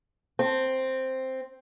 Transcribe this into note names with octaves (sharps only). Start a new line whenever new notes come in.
C4